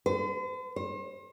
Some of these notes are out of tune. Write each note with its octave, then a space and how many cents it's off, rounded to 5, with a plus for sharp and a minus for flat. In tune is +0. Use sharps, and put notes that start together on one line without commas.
C5 -45
C5 +40